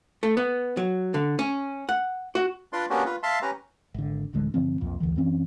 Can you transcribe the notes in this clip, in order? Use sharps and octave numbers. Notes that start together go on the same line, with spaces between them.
A3
B3
F#3
D3
C#4
F#5
F#4
D4 F4 B4 D5 C6
A#3 B3 C#4 D4 F#4 G4
F4 B4
E5 F5 A5 C6
C#4 G4 B4 A#5
G#1 D3
D1 A1 D3 G#3
G2 D3 F3 C4
B1 F2 A#2
F#1 D2 D3 E3
F#2 E3 C4 C#4